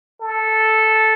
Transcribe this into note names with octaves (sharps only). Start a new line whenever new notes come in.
A4